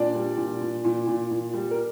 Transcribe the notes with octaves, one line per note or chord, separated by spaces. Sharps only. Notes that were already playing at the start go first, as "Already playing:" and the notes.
Already playing: A#2 D4 D5
G3
A#2
A#2
A#2
A#2
A#2
G3
A#4